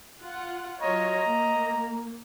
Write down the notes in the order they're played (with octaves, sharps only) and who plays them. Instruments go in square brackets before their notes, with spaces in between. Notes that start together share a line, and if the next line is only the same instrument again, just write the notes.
[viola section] F4 F#5
[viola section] F#3 F4 C#5 [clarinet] D#5 [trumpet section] A#5
[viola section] A#3